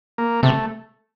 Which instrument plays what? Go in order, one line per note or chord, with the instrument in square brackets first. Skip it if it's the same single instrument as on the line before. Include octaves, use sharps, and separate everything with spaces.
[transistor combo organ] A#3
[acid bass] C3 [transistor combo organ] A3